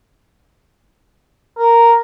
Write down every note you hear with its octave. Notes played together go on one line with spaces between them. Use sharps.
A#4